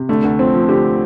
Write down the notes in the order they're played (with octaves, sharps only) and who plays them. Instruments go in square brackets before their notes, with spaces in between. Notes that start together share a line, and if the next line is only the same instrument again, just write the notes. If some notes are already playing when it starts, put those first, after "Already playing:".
Already playing: [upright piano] C3
[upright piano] D3 [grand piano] A3
[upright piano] D2
[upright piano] F3 [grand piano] C4
[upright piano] F3
[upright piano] D3 [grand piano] G4